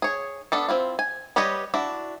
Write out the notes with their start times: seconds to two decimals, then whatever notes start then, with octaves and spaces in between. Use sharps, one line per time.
0.02 G#4 C#5
0.52 B3 D4 A4
0.69 C4 E4 F4
0.99 G#5
1.36 G3 G4 B4 C#5 D#5
1.74 D4 E4 F#4